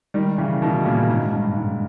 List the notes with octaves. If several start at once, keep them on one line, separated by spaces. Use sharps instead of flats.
D#3 G3
C#3 E3
B2 D#3
A#2 C#3
G#2
G2
G#2